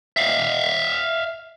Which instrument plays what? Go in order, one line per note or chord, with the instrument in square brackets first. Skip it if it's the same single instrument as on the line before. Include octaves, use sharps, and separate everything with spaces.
[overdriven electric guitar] E5 F5